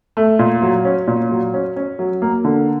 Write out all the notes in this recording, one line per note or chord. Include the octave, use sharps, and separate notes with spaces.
A3
A#2
F#3
C#4
A#2
F#3
C#4
C#4
F#3
A#3
D3